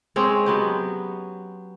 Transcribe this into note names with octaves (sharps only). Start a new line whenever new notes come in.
G#3 C4 C#4
F#3 B3 G4